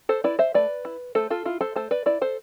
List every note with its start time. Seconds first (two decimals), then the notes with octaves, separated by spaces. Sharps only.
0.09 A4 C5
0.24 E4 B4 D5
0.39 C5 E5
0.54 A3 B4 D5
0.85 E4
1.15 A3 A4 C5
1.30 F4 A4
1.45 E4 F4
1.61 A4 C5
1.76 A3 A4 C5
1.91 B4 D5
2.06 E4 B4 D5
2.21 A4 C5